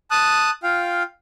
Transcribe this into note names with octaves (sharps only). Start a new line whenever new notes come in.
A5 D#6 F#6
F4 F5 G5